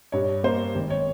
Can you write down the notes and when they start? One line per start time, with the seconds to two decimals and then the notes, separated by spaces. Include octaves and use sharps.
0.12 G2 C#5
0.43 A#3 C5
0.75 G#1
0.90 C#5